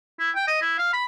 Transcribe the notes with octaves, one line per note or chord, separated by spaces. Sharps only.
E4
G5
D#5
E4
F5
B5